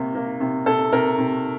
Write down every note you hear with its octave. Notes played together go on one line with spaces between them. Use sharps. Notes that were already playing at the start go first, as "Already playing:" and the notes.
Already playing: C3 A#3
A#3
C3
C3 A4
C3 A#4
C3